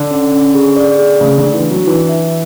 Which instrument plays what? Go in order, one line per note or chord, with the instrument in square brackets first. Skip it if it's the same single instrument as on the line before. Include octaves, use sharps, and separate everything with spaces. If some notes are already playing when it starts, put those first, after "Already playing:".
Already playing: [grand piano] D3 [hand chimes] A4
[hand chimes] C#4
C#4
G#4
D5
G#4
[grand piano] C#3 [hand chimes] A3
[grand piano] D3
[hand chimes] D4
[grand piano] E3
[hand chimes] D4
[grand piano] F#3
[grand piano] E3 [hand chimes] E4
[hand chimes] E5